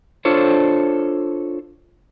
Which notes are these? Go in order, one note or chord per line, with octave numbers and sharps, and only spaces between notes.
D4 F4 A4 C5 C#5